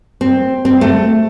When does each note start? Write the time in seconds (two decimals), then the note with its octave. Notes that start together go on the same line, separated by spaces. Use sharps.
0.21 C4
0.65 C4
0.81 A3